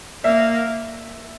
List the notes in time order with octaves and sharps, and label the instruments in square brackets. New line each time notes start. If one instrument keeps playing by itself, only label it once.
[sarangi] A#3 [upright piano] E5